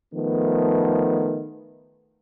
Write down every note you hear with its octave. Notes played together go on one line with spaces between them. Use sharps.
D#3 F3 A3 B3